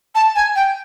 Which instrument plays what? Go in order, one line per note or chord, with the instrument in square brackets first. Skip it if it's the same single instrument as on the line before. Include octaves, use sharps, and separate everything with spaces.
[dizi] A5
G#5
G5